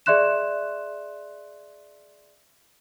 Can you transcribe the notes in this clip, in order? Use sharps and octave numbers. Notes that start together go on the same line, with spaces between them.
G#4 D5 E5 C6 F#6 E7